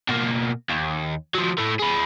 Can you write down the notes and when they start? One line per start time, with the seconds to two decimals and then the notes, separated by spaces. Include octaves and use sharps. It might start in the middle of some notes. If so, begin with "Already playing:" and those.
0.09 B2 A#3
0.69 D#2
1.34 F3 F#3
1.58 A2 A3
1.79 G#4 B4